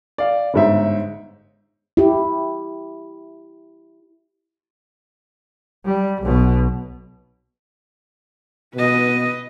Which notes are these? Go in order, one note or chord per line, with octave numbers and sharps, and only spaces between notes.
D5 F5
G1 G#2 E5
E4 G4
G3
B1 B2
B2 B4 D#5